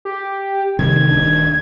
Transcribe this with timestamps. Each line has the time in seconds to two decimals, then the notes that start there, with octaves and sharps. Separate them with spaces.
0.05 G4
0.79 C3 D#3 G3 G#6
1.10 D#1 D#2 D4